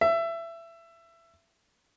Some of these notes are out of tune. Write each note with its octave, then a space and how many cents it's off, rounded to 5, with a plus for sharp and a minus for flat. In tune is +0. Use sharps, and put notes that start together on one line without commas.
E5 +20